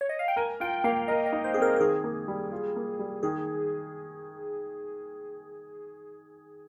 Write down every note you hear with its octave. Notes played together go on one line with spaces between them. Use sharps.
C#5
D#5
F5
G5
A#4 G#5
F4 G5
A#3 F5
A#4 D#5
D#5
D#4
C5
C4 G#4
A#4
A#4
D#3 G#4
A#3
G3
F4
A#3
G3
D#3 G#4